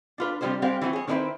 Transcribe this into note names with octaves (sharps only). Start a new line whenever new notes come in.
D4 F4 B4
C3 F3 G3 G#3 F4 C5
G3 G#3 C4 G4 F5
E3 F#3 C4 F#4
G#4 C#5
D#3 C4 D4 E4 B4 C5